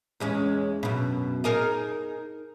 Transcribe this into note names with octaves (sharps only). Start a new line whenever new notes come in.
E2 G#3 C#4
F#2 B2
D#4 G#4 A#4